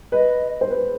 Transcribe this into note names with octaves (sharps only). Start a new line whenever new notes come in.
B4 D#5
C5
B4